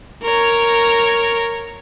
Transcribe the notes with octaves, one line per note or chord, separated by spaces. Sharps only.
A#4 C#5